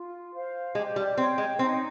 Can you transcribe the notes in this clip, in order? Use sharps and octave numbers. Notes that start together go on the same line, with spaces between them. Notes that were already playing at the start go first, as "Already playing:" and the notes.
Already playing: F4
C5 F5
G#3 G4
G3
C4 C#5 G5
G#3
C4 D#4